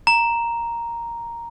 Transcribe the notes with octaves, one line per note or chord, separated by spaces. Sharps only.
A#5